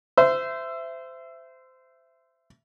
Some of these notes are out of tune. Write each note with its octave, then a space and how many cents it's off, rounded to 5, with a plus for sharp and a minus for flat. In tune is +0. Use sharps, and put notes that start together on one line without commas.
C5 -20 E5 +15